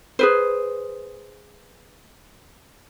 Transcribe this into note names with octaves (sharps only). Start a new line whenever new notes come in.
G#4 B4 C5